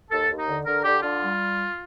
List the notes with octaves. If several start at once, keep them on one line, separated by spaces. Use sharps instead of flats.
D#2 A4
D#2
D#4
D3
D3 A#4
D3 G4
D3 F4
G3